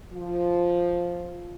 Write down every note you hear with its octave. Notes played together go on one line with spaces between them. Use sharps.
F3